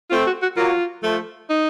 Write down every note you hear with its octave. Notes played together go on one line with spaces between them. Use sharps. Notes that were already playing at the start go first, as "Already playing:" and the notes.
A3 C4 F4
F#4
F#4
F#3 A#3 F4
F3 A3
D#4